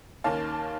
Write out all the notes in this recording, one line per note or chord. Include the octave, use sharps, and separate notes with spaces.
D#2 D#3 A#3 C#4 F5 A5